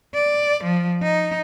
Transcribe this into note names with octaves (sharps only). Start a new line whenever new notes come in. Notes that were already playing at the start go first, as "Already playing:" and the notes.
D5
F3
D#4